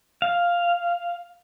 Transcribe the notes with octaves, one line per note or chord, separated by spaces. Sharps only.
F5